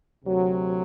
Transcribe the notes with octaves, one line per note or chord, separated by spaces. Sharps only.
D2 C3 F#3